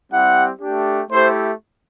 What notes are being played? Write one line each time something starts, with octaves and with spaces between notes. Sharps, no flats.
G3 C4 E4 G4 F#5
A3 D4 G4
A3 E4 G4 C5